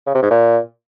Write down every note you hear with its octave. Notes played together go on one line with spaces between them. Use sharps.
C#3
C3
G#2
A#2